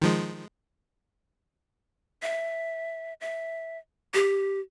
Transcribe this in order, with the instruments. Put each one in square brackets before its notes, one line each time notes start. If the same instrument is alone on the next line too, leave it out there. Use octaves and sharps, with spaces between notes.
[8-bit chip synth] D#3 F3 G#3
[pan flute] E5
E5
G4